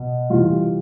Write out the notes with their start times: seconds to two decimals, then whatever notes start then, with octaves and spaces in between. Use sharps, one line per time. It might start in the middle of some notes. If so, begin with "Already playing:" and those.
Already playing: B2
0.30 C3 E3 G3 F4